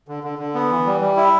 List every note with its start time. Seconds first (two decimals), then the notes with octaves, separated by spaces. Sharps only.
0.08 D3
0.24 D3
0.39 D3
0.55 B3
0.71 E3
0.86 G3
1.01 G3
1.17 E4